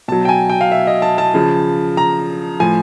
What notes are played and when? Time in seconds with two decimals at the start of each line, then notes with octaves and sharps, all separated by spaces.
0.08 B2 F#3 A5
0.25 G5
0.29 G#5
0.49 G5
0.61 F5
0.72 E5
0.87 D#5
1.02 A5
1.18 A5
1.34 C#3 F3
1.97 A#5
2.60 A2 F3 G#5